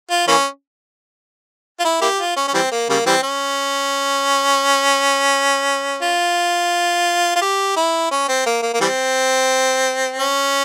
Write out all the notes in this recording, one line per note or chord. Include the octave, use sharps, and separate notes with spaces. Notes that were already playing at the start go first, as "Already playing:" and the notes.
F4
E3 A#3 C#4
F4
E4
A#3 E4 G4
F4
C#4
C#4
E3 G3 C4
A#3
C#3 G3 A#3
E3 G3 C4
C#4
F4
F4
G4
E4
C#4
C4
A#3
A#3
A#3
E3 G3 C4
C#4